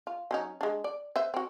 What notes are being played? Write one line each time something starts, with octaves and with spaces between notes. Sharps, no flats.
F4
F#3 C#4 D#4
G#3 D4
D5
B4 C5 E5
C4 F#4